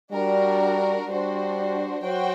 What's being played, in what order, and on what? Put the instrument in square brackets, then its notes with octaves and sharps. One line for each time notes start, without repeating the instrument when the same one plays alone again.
[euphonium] G3 [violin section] D4 F#4 A#4
[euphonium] G3 [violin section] D4 F#4 C5
[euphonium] F#3 [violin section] F#4 C5 G5